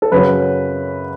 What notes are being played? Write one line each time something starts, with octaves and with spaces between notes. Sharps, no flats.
A4
F#2 C#3 F#3 B4